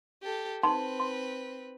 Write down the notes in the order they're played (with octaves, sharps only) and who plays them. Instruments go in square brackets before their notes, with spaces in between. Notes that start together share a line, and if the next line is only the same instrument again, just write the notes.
[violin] G4 A4
[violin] C4 B4 [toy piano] D#4 A5 C6
[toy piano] C6